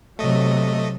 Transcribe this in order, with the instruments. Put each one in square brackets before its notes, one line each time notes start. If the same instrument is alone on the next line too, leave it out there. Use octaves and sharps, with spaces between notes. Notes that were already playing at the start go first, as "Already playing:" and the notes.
[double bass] C3 F#3 [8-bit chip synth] A3 D#5